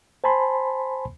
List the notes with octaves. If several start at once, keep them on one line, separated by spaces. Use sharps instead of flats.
C5 G#5 A5 B5 C6